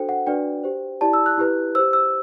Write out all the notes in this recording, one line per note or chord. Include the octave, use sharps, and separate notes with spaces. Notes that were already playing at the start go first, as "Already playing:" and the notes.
Already playing: D4 F#4 A4 C5 G5
F#5
D4 F#4 B4 D5 G5
G4 C5
E4 G4 D5 A5
E6
F#6
E4 G4 B4
G4 C5 E6
E6